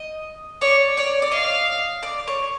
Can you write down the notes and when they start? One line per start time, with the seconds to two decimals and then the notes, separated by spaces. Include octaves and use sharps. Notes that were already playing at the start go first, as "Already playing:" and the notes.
Already playing: D#5
0.61 C#5 D5
0.97 C#5 D5
1.22 D5
1.32 D#5 F5
2.03 D5
2.28 C#5